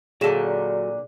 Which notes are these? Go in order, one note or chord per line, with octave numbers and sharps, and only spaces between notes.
A#2 D3 F#3 G#4 A4 E7